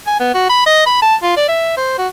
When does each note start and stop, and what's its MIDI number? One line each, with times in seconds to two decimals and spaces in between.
0.07 0.18 80
0.20 0.29 59
0.34 0.46 66
0.50 0.63 83
0.66 0.85 75
0.86 0.98 83
1.02 1.15 81
1.23 1.36 65
1.37 1.45 74
1.49 1.77 76
1.77 1.96 72
1.98 2.08 66